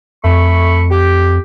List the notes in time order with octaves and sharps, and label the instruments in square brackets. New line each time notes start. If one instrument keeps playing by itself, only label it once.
[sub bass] F2 [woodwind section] A3 B5 C#6
[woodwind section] G4